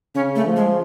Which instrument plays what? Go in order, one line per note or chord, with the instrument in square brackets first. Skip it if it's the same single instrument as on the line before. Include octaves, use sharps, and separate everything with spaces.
[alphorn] C#3 [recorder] C#4
[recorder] A3
[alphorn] F3
[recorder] G#3